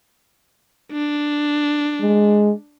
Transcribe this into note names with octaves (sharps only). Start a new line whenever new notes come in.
D4
G#3